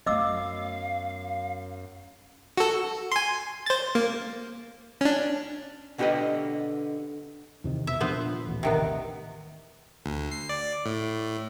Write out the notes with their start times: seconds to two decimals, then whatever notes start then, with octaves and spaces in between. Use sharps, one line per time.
0.06 F#2 A3 B3 D#5 F5 D6 E6
2.57 F#4 A4
3.12 G#5 C6
3.66 C5 A6
3.95 A#3
5.01 C#4 D4
5.98 B2 D3 F#4 G4 B4 D#5
7.64 E2 C3 D#3
7.87 B2 E5
8.01 A#2 F3 B3 D4 B4 C5
8.47 D#1 A1
8.63 C3 D#3 B3
10.06 D2
10.31 C7
10.49 D5
10.86 A2